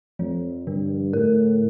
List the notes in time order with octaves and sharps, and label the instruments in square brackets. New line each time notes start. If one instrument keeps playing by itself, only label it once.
[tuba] F2 [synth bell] F3
[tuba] G2 [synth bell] D3
[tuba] A2 [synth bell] A#4